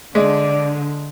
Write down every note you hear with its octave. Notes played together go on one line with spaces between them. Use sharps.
D3 G#3 D5